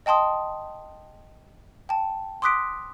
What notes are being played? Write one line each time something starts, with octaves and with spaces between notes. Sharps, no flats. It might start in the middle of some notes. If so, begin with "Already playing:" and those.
D#5 G5 A5 C6 D#6
G5 A5
C6 D6 D#6 F#6 B6 D7